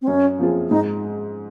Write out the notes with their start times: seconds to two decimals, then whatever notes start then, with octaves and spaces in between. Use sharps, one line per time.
0.02 C4
0.07 F#2 C#4
0.39 F3 C4 F4 G#4
0.70 G#2 D#4